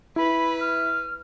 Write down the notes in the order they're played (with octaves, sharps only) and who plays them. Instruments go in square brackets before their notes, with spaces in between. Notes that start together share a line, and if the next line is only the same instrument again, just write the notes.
[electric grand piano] E4 [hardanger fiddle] B4 [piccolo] B5
[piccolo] F6